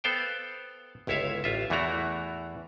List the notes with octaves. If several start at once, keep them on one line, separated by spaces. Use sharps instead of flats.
B3 A4 C5 F5 G5
G1 C#2 E4 C#5 E5 F5
A1 F4 E5
E2 E3 A3 E4 F#4 A#5